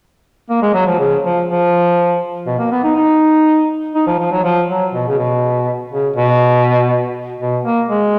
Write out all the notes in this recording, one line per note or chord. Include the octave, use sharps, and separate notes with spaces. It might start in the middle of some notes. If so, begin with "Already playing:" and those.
A#3
G#3
F#3
F3
C#3
F3
F3
B2
A#3
B3
D#4
D#4
D#4
F3
F3
F#3
F3
F#3
B2
C#3
B2
C#3
B2
B2
A#3
G#3